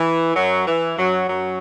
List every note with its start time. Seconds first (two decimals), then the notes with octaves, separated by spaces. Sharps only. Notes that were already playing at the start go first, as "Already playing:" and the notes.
Already playing: E3
0.35 F#2 F#3
0.67 E3
0.97 F#2 F#3
1.28 F#2 F#3